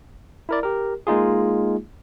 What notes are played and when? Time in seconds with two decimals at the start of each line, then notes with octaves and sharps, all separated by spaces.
0.49 E4 A#4 D5
0.63 G4 A#4
1.07 G#3 A#3 D#4 F4 G#4